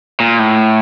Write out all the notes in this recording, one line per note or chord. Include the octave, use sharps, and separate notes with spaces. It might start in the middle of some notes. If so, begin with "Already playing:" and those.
A#2
A2